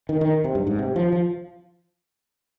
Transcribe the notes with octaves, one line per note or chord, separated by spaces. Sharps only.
D#3
D#3
C3
G2
G#2
C3
F3
F3